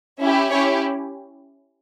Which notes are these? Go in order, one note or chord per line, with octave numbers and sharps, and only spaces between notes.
C#4 E4 G4
C#4 E4 G4 C#5